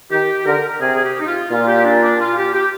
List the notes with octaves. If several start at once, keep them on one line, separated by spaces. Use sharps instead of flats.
D#3 G4
D3 A#4
A#4
C3 G#4
G#4
G4
D#4
F4
A#2 F4
G4
D4
D4
F4
G4
G4